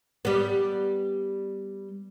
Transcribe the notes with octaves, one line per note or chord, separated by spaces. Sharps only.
G3 B3